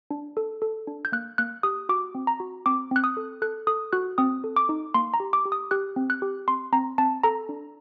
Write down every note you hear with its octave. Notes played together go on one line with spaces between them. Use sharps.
D4
A4
A4
D4
G6
A#3 F#6
A#3 F#6
G4 D#6
F#4 D6
C4
A#5
F#4
C4 D6
C4 F#6
D#6
A4
A4 F#6
A4 D#6
F#4 F#6
C4 D#6
A4
D6
D#4
A#3 C6
A#5
G4
D6
G4
D#6
G4 F#6
C4
F#6
G4
C4 C6
C4 A#5
C4 A5
A4 A#5
D4